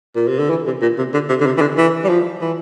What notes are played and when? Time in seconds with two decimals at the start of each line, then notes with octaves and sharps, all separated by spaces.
0.16 A#2
0.28 C3
0.39 D3
0.50 E3
0.67 C3
0.82 A#2
0.98 C3
1.14 D3
1.29 C3
1.41 D3
1.46 C3
1.57 E3
1.61 D3
1.78 E3
2.04 G3
2.09 F3
2.42 E3